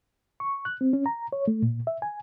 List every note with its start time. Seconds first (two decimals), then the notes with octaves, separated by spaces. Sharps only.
0.40 C#6
0.65 F#6
0.81 C4
0.93 C#4
1.06 A#5
1.33 C#5
1.48 A3
1.62 A#2
1.87 E5
2.02 G#5